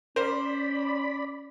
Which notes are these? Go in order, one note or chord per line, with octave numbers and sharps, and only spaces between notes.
C#4 A#4 C5 D5 B5